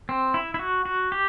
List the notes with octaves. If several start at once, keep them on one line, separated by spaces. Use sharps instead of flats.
C4
E4
E4
F#4
F#4
G4